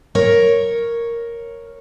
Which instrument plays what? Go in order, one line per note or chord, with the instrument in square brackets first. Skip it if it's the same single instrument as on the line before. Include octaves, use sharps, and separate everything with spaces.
[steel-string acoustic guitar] A#4 C#5